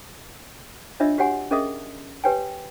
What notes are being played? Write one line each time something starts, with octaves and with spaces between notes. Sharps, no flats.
D4 F4 C#5 D#5 E5 E6
F#4 G4 C#5 F#5 G#5
C#4 G#4 A#4 D#5 E5 D#6
G4 B4 C#5 G5 G#5